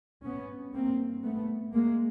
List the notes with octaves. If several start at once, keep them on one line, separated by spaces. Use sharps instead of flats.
G2 B3 C#4
A#3 C4
A3 B3
G#3 A#3